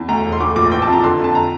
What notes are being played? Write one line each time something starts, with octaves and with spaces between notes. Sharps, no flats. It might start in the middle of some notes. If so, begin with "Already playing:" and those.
Already playing: E2
D2 A#5
E1
C6
A2 D6
A#1 D6
E3 G5
A5
F2
A#5
D3 C6
F2 A5
A#5